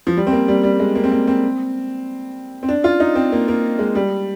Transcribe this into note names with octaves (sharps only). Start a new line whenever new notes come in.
F3
G3
C4
A#3
G3
G3
G#3
A#3
C4
A#3
C4
C4
D4
F4
D#4
C4
A#3
A#3
G#3
G3